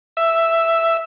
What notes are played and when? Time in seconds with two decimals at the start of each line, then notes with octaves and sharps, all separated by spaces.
0.17 E5